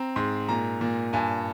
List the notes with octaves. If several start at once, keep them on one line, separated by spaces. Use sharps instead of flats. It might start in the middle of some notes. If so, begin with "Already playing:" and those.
Already playing: C4 A#5
G#2 C6
A#2 A#5
A#2
G2 G#5